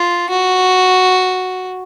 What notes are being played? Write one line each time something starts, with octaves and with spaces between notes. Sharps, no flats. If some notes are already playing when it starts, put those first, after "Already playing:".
Already playing: F4
F#4